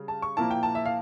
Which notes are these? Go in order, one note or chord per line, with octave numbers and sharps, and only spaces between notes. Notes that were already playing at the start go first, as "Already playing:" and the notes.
Already playing: C#3 G3
A5
C#6
A#2 F3 A#3 E4 A5
G5
A5
E5
F5